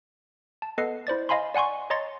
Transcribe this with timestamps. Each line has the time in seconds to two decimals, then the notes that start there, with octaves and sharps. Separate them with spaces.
0.62 A5
0.78 B3 A4 B4 D#5 F#5 C7
1.07 E4 C5 D5 A6
1.29 D#5 F5 G#5 B5 C6
1.54 D5 F#5 G#5 C6 C#6
1.90 C#5 D#5 A#5 C6 A6 C#7